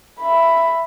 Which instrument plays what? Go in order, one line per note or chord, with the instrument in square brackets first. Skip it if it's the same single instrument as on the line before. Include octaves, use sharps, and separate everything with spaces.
[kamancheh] E5 B5